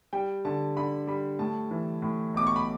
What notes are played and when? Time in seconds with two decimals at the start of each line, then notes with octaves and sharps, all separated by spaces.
0.13 G3 G5
0.45 D3 A5
0.76 D3 B5
1.07 G3 B5
1.39 A2 A5
1.71 E3
2.02 A2
2.34 B1 D6
2.47 C#6
2.56 B5